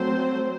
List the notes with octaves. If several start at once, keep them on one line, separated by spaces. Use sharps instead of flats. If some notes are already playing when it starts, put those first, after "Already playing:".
Already playing: F#3 A3 C4 C5